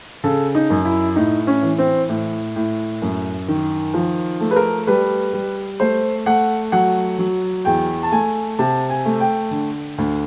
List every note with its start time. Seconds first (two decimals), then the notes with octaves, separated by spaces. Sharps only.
0.24 C#3 A4
0.55 D#4
0.70 F#2
0.85 E4
1.16 A2 D#4
1.47 C#4
1.62 E3
1.78 C4
2.09 A2
2.56 A2
3.02 F#2
3.48 D#3
3.94 F3
4.40 A3
4.51 B4
4.56 A#4
4.87 G3 B4
5.33 G3
5.80 A3 C5
6.26 A3 F#5
6.72 F#3 F#5
7.19 F#3
7.65 E2 G5
8.03 A5
8.11 A3 G#5
8.59 C3 A5
8.90 G#5
9.05 A3
9.20 G5
9.51 D3
9.98 D2